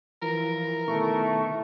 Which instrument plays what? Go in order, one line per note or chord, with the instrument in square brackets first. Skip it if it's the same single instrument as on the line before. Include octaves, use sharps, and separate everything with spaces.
[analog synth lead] E3 [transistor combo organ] F3 [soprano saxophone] A#4
[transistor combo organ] B2 D#3 E4 [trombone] A3 [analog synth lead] C#6